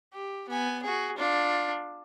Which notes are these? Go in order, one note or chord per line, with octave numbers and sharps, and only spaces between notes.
G4
B3 G#5
F#4 G#4
D4 F4